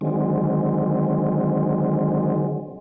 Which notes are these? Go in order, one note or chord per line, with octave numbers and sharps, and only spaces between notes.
D3 D#3 F#3 G#3 C4